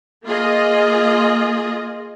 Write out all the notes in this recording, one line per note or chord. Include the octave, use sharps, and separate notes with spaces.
A#3 F4 G#4 D#5